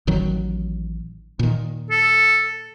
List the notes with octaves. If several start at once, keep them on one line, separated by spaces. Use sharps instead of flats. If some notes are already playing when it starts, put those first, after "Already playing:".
A1 D#3 F#3
A#2 D#3
A4